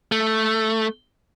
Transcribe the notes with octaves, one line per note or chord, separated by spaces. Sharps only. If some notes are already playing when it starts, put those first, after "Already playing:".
A3